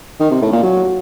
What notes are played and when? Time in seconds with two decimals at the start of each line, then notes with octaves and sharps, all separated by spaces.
0.20 D#3
0.31 C3
0.41 A2
0.52 A#2
0.63 F#3